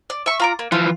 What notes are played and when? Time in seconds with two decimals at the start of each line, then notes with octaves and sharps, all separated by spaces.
0.10 D5
0.26 E5 C#6
0.40 F4 A#5 D6
0.59 A#3
0.72 E3 F3 F4